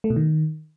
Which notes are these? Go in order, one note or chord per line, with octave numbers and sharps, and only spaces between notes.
A3
B2
D#3